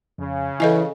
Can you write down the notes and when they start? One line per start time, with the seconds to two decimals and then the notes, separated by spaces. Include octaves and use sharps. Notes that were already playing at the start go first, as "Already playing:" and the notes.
0.18 F2 C#3
0.60 E3 E4 A4 D#5 G#5